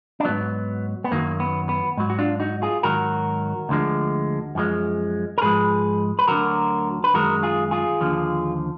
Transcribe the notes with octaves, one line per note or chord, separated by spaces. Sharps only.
D4
G#2 F#3 B3
B3
F#2 D#3 F#3 A#3
B3
B3
G#2 F#3
F#4
D4 F4
D#4 F#4
F4 G#4
G#2 D#3 F#3 F#4 A#4
D2 D3 F3 G#3
F#2 F3 G#3
A#4
G#2 F3 G#3 G#4 B4
B4
D2 D3 F#3 F#4 A#4
B4
F#2 D#3 G#3 F#4 A#4
F4 G#4
F4 G#4
D#2 D3 F3